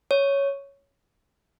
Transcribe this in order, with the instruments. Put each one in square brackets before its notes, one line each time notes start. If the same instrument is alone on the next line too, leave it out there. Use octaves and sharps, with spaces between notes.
[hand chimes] C#5